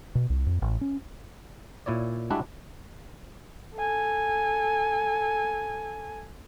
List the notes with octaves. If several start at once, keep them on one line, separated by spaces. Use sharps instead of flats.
B2
C2
F2
A1
C#4
A#2 E4 C#5 D5
G3 G#3 D4 E4 F#4 E5
A4 G#5